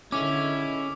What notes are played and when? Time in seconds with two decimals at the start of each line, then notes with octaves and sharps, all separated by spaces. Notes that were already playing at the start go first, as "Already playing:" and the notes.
0.12 D3 D#3 G#3 C#4 E4 D6